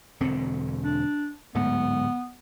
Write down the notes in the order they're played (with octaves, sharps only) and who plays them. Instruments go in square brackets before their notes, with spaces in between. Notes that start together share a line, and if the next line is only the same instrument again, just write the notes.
[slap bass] E1 D3 C4
[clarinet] D4
[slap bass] D1 G#2 A3 [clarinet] B3